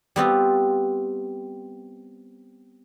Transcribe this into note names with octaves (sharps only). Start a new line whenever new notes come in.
G3 B3 C4 F4